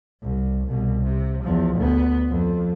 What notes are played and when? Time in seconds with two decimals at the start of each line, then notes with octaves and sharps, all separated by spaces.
0.22 C2
0.67 C2 B2
1.03 C3
1.43 E2 F3
1.76 D2 B3
2.30 F2